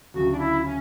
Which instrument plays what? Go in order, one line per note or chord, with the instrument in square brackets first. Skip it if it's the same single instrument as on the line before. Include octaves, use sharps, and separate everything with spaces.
[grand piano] D2 C#3 F#3 [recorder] F#4
[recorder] D4
E4
C#4